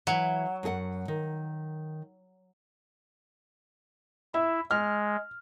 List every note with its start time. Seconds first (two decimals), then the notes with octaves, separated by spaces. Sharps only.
0.07 E3 F#3 E5
0.63 F#2 G#4 F#5
1.08 D#3
4.34 E4 E5
4.71 G#3 F6